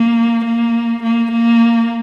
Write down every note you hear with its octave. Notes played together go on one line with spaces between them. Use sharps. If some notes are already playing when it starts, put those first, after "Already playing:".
Already playing: A#3
A#3
A#3
A#3